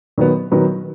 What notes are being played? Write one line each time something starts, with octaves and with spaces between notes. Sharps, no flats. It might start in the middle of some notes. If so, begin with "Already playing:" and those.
D#3 F#3 B3
D#3 F#3 B3